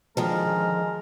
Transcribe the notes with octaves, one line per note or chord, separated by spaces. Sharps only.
D3 D#3 F3 G#3 A#4